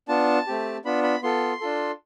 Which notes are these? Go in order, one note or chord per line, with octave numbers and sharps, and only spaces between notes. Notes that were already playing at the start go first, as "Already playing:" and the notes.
B3 D4 F4 A5
A3 C4 G4
B3 D4 F4 B5
B5
B3 F4 A4 C6
D4 F4 A4